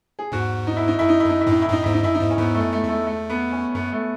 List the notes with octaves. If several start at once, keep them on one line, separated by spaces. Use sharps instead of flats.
G#4
E2 G#2 F#4
D#4
E4
D#4
F#2 E4
D#4
F#2 E4
D#4
E4
F#2 A2 D#4
E4
F#2 A2 D#4
E2 G#2 E4
D#4
F#2 E4
D#4
E2 G#2
C#4
E2 G#2 B3
A3
F#2
A3
E2
A3
A3
B3
C#4
F#2 B3
A3